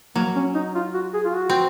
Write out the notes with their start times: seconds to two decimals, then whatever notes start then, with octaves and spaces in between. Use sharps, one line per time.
0.15 F#3 A#3
0.36 C#4
0.55 D#4
0.75 F4
0.94 F#4
1.14 G#4
1.25 F4
1.35 F#4
1.49 C4